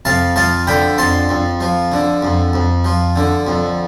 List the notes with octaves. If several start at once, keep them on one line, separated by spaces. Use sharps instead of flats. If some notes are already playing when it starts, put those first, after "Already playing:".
F2 F5 A5
F3 F5 A5
D3 G5 B5
F2 A5 C6
F2
F3
D3
F2
F2
F3
D3
F2